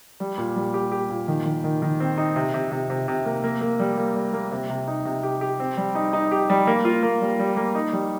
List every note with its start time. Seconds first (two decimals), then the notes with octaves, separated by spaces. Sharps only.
0.20 G3
0.38 A#2
0.56 G3
0.74 G4
0.92 G4
1.10 A#2
1.28 D#3
1.46 D#3
1.64 D#3
1.82 D#3
2.00 C4
2.18 D#4
2.36 C3
2.54 C3
2.71 C3
2.90 C3
3.08 C3
3.26 A#3
3.44 A#3
3.61 A#3
3.79 G3
3.97 A#3
4.15 G3
4.33 A#3
4.52 C3
4.69 C3
4.87 D#4
5.05 C3
5.23 G4
5.41 G4
5.60 C4
5.77 G3
5.95 D#4
6.13 D#4
6.31 G4
6.50 G3
6.67 A#3
6.85 F4
7.03 A#3
7.21 G3
7.39 G3
7.57 A#3
7.75 D#4
7.93 G3